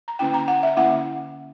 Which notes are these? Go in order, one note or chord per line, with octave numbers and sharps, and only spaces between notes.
A#5
D3 A#3 C#4 E4 G5
A#5
F#5
E5
D3 A#3 C#4 E4 F#5